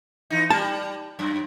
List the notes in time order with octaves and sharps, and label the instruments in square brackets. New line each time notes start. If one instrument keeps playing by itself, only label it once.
[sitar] E3 D#4
[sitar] G3 [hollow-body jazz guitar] A5
[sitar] F#2